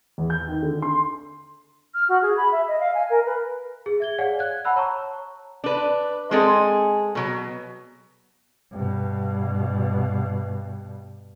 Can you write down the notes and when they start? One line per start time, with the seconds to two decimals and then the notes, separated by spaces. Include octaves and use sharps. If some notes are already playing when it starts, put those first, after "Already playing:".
0.18 E2
0.30 G6
0.48 D#3
0.63 D3
0.82 C6
1.94 F6
2.09 F#4
2.22 G#4
2.37 B5
2.52 E5
2.68 D#5
2.80 F5
2.95 G#5
3.10 A#4
3.26 B4
3.86 G#4
4.00 E5 G#6 G7
4.18 G#4 C#5 D5 F5 F#5 G#5
4.39 F#6 G#6
4.65 F#5 A5 B5 E6 F#6
4.76 C#5 A5 A#5 C#6
5.64 D4 B4
6.31 G#3 C4 G#4 A4 D#5
7.15 B2 F#3
8.72 G2 B2